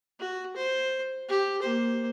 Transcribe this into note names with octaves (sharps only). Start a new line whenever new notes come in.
F#4
C5
G4
A#3 C5